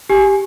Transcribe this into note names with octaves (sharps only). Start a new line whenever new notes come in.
G4 G#5